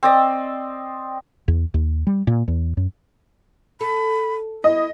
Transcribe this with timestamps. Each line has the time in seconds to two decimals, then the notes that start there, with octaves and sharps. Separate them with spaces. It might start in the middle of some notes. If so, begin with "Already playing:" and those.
0.03 C4 D5 D#5
1.48 E2
1.74 D#2
2.07 G3
2.27 A#2
2.48 E2
2.77 F#2
3.81 A4 B5
4.64 E4 D#5